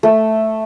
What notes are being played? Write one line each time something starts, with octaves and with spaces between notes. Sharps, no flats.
A3